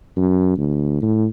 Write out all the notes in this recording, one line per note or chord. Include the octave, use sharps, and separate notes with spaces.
F#2
D2
A2